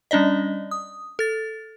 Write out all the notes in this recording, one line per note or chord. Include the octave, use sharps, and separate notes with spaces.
G3 C#4 D4 D5 D#5
D#6
A4 A6